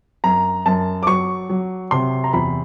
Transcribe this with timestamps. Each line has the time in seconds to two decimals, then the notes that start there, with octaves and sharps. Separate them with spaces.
0.24 F#2 A#5
0.66 F#2 A5
1.03 D6
1.07 F#3 C#6
1.50 F#3
1.91 C3 C6
2.24 A#5
2.33 E2 B5